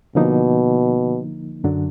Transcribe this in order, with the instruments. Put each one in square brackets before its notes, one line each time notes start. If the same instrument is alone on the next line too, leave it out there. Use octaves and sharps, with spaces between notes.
[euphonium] B2 [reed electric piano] D3 F3 A#3 D#4
[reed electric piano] F#2 D3 F#3 D4